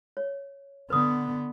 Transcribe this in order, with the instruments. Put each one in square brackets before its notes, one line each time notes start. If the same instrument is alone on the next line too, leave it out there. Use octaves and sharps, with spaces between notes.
[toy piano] C#5
[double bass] D3 B3 [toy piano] B4 D#6